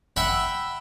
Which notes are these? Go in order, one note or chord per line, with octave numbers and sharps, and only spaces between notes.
E5 F#5 G5 B5